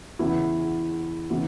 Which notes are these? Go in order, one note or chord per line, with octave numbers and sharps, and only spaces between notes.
E2 C#3 E3 B3 E4
C#3 E3 B3 E4